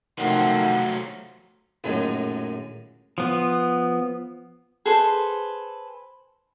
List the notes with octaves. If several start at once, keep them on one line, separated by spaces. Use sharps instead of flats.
C3 D#3 F3 F#3 A3 C4 F#5
A#1 F#2 A2 D#3 F#3 G#3
F3 B3
G#4 A4 B4 C5